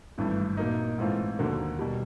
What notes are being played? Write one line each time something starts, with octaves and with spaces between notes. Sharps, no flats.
G#1 G2 E3 A3
A#2 F#3 A#3 D#4
G#2 E3 A3 C4 F4
D#2 D3 F#3 A#3
B2 G3